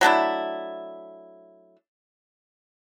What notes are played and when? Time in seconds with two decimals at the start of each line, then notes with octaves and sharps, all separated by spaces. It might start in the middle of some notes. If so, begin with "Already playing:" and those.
0.01 F#3 A3 D4 E4